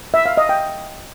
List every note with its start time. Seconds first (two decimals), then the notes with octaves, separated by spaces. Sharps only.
0.14 E5
0.26 F5
0.37 D#5
0.49 G5